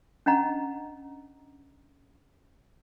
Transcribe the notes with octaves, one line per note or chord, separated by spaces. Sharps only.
C#4 D4 D#5 F#5 A#5